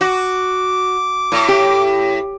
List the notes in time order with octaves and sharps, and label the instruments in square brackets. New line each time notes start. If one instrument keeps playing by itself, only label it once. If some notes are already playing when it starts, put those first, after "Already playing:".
[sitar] F#4 [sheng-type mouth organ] D6
[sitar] A2
[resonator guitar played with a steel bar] G4